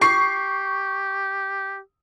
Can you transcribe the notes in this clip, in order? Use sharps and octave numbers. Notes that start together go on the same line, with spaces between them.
G4 C#6 C7